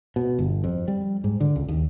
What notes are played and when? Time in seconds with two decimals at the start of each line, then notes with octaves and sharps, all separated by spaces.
0.16 B2
0.39 G1
0.64 F2
0.88 G3
1.24 G#2
1.40 D3
1.56 C#2
1.68 D#2